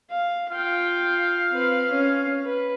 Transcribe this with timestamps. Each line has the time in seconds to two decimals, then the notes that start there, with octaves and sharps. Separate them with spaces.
0.11 F5
0.51 F4 F5 G5
1.52 C4 B4
1.90 C#4
2.45 B4